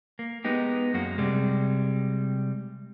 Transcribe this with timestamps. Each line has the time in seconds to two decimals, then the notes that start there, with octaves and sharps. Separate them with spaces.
0.19 A#3
0.44 G#3 B3 D#4 G4
0.94 F#2 G#3 A#3 F#4
1.18 C3 G3 G#3